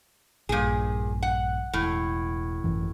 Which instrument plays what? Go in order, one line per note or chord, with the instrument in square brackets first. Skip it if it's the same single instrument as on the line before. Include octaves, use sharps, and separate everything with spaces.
[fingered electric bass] A#1 G2 [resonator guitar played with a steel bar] A#2 G#4
[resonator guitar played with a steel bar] F#5
[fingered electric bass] E1 [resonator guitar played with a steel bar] A2
[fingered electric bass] G#1 F#2 E3